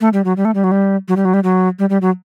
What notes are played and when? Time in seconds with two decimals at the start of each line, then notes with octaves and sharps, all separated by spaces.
0.01 A3
0.13 G3
0.25 F#3
0.37 G3
0.45 A3
0.55 G3
0.64 F#3
0.72 G3
1.08 F#3
1.16 G3
1.25 F#3
1.34 G3
1.44 F#3
1.79 G3
1.90 G3
2.02 F#3